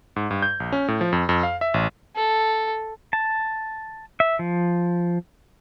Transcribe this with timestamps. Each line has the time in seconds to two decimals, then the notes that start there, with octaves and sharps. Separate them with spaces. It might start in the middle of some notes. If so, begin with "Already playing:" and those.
0.16 G#2
0.31 G2
0.42 G6
0.60 A#1
0.72 C#4
0.88 A2
1.01 F3
1.12 F2
1.29 F2
1.43 F5
1.61 E5
1.74 A1
2.16 A4
3.13 A5
4.20 E5
4.39 F3